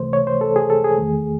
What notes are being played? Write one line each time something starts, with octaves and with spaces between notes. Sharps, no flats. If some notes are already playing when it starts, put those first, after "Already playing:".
Already playing: C#2 C3 E3 A3 C5
C#5
C5
A4
G#4
A4
G#4
E2 D#3 A3